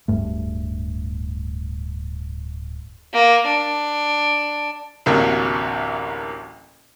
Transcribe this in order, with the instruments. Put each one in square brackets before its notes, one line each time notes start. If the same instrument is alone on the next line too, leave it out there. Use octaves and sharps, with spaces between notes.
[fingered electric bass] D1 G2 A3
[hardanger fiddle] A#3
D4
[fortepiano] A1 D2 C3 F#3 A#3